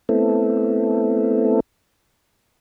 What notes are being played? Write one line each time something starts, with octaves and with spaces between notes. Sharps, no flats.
A3 B3 C4 E4 A4